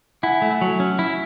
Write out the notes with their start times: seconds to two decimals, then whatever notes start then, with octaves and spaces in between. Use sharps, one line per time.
0.23 E4 F#5 G#5
0.42 A3
0.61 F#3
0.80 C#4
0.99 E4